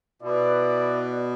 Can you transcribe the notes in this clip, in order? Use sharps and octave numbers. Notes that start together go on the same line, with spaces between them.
B2 E4 B4 D5